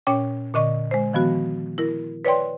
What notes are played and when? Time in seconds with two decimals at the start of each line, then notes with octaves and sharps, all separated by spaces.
0.07 A#2 C#4 C#5 G5 D6
0.54 A#2 D3 D#5 C#6
0.91 G#3 C5
1.13 D#3 F3 B3 F#4
1.78 E4 A#4
2.25 B4 C#5 D5 G5 C6